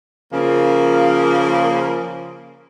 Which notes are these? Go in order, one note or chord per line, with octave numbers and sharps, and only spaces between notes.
C#3 F3 A#3